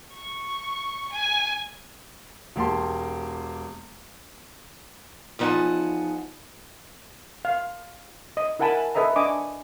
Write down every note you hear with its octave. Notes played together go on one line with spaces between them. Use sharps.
C#6
G#5
E1 A#3 G4 A5 C6
E2 F3 D#4 F#5 G#5 A5
F5
D#5
E4 A#4 F#5 G#5 A5 B5
A4 B4 D#5 E5 A#5
D4 D#5 G#5 C#6 D6